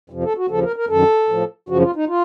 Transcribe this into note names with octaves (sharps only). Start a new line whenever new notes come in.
F2 C3 F3
A4
F#4
D#2 C#3 F3 A4
A#4
A#4
F#2 D#3 A4
A2 F3
F#2 C#3 F3 F#4
F4
D#4
F4